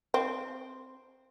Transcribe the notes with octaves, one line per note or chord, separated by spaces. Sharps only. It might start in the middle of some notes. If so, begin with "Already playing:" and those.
C4